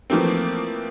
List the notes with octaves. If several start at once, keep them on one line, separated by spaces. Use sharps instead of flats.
E3 F3 A3 A#3 C4